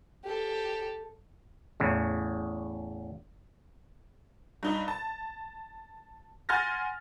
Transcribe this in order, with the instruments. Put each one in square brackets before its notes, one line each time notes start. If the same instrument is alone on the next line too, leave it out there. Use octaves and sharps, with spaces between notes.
[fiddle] G4 A4
[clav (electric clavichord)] E2 A2 C#3
[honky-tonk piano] G2 D#4 D#5
A5
F#5 G#5 C6 F6 A6 A#6